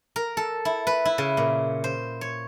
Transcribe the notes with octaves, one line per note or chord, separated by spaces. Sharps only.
A#4
A4
E4
B4
E4
C#3
A#2
C5
C#5